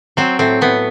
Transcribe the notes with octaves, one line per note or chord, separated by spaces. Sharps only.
F#3 C4
A2 C4
A2 B3